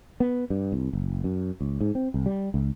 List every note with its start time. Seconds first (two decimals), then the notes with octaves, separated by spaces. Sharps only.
0.20 B3
0.50 G2
0.72 C2
0.93 F#1
1.24 F#2
1.61 C#2
1.81 G#2
1.95 C4
2.14 C2
2.26 G3
2.54 C#2